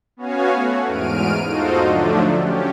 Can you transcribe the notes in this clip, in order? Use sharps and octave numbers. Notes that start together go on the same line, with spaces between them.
B3 C#4 F#4 C#5 F5 G#5
A3 F#4
E2 G#2 F6 D7 D#7
D#4 F4 F#4 A4 C5 D#5
D3 F3 F#3 A3 D4
C#4 G4